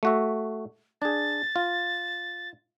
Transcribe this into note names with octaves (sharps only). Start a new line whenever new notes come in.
A3 F#4 E5
D4 G#4 A6
F4